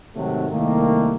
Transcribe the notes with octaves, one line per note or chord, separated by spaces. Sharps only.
G#2 C3 D#3 F#3 A3
C2 D#3 A3 A#3